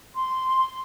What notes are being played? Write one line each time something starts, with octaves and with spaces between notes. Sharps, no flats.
C6